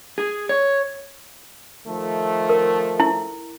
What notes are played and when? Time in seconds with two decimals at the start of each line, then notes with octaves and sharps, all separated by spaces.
0.18 G#4
0.49 C#5
1.86 D#3 F3 A3
2.49 A#4
3.00 E4